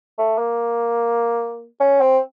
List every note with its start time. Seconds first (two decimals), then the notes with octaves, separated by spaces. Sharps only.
0.18 A3
0.38 A#3
1.80 C#4
2.01 C4